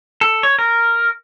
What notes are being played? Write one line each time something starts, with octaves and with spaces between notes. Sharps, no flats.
A4
C#5
A#4